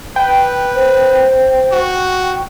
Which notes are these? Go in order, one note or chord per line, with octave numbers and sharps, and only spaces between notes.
B4 G5
C5
F#4